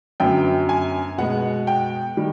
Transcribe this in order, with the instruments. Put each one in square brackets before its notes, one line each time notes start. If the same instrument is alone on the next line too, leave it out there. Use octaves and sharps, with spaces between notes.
[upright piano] F#2 D3 F#3 B3 G5
G#5
B2 G#3 B3 F#5
G5
D#3 G3